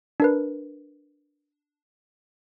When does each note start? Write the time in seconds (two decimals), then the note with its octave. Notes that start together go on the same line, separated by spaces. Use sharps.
0.20 D4 A#4 B4